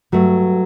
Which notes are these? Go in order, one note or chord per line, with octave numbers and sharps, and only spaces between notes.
G2 F#3 A3